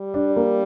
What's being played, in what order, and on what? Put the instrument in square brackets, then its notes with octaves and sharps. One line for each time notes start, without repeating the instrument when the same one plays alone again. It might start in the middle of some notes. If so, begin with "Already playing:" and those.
Already playing: [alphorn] G3
[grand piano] D4
A#3